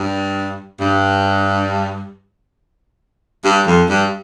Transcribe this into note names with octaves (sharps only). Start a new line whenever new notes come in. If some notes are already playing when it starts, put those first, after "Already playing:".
Already playing: G2
G2
G2
F2
G2